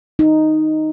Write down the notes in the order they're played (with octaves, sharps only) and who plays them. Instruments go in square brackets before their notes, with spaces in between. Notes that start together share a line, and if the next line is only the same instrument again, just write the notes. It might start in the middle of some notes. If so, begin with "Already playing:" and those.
[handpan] D#4